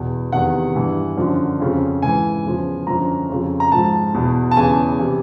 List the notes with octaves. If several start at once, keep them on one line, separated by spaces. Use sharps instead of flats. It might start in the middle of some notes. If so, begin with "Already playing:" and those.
Already playing: E2 B2
E2 C3 D#3 F#5
G2 E3
F#2 D3 F3
F2 C#3 F3
G#2 E3 G#5
E2 C#3 F3
F#2 D3 F3 A#5
F2 C#3 F3
A#5
G#2 F3 A5
E2 B2
A5
E2 C#3 E3 G#5
C3 E3